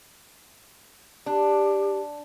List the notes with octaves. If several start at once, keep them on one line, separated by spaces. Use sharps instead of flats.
D4 G4